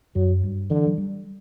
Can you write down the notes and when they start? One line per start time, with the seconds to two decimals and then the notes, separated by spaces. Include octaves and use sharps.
0.15 F#2 F#3
0.43 G2
0.70 D3 E3
0.87 F#3
0.98 G3